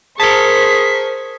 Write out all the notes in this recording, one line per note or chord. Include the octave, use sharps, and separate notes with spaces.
G#4 A#4 C5 A5 C#6 B6